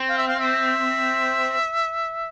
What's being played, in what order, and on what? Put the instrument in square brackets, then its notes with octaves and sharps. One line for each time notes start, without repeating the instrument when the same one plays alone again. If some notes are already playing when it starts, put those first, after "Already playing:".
Already playing: [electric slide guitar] C4
[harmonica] F5
E5
F5
E5